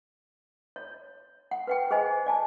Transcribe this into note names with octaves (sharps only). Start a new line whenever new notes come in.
C#5
F#5
B4 F#5 G5
G#4 C5 D#5 G#5
D5 G#5 A5